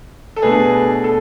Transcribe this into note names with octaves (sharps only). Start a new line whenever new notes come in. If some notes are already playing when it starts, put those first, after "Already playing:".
A4
B2 A3 D4 G#4 B4
A4